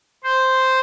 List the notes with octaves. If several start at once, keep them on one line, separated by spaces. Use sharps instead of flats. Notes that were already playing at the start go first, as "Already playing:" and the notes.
C5